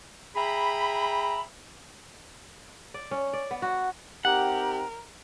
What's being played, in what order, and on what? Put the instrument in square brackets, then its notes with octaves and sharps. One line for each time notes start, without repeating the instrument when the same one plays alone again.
[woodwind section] G#4 E5 G5 A#5 B5
[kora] D5
C#4
D5
B3
F#4
[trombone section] C4 D#4 G4 [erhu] A#4 [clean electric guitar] F#5